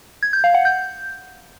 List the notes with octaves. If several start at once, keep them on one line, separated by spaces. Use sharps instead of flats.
G#6
G6
F5
F#5
G6